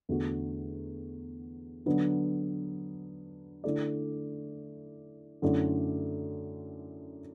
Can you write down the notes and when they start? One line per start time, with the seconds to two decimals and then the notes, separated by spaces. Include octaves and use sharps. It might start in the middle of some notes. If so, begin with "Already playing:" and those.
0.09 E2 D3 A3 F#4
1.86 D3 F#3 B3 D4
3.64 D3 A3 E4 D5
5.42 F#2 D3 A3 E4 D5